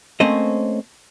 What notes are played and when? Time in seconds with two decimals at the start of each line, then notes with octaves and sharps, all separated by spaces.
0.20 A3 A#3 C4 C#4 C5 D#5